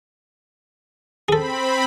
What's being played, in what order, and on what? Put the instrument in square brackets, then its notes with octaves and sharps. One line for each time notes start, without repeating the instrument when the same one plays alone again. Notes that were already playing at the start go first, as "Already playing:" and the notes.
[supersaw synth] C4 B5 [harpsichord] G#4 A4